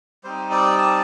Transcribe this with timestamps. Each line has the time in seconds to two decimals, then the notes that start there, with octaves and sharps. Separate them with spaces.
0.24 G3 C4 D#4 C5
0.51 D5
0.78 A5